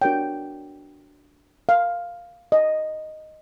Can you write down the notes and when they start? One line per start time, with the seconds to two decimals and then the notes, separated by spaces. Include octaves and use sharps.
0.02 D4 F#4 A#4 C#5 G5
1.69 F5
2.52 D#5